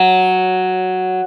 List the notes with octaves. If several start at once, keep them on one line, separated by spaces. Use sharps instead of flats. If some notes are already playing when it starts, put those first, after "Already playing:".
Already playing: F#3